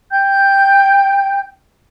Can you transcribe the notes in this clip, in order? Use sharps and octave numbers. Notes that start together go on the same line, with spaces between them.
G5 G6